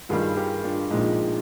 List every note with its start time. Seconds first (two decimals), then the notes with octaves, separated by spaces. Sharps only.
0.09 G2 D#3 G3 F4 G#4
0.36 G4 A#4
0.64 D4 F4
0.91 A#1 A#2 F3 G#3 D#4